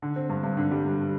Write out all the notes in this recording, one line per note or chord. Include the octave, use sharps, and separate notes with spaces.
D3
C4
G2
G2
D3
G3
G2